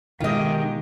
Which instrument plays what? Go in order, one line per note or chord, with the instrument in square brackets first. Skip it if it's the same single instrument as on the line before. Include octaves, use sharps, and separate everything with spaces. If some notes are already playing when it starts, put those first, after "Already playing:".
[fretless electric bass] G#2 B2 [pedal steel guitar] D#3 [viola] G#3 G4 [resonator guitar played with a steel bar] F4 D#5